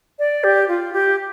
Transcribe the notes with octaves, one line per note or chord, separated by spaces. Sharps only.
D5
G4
F4
G4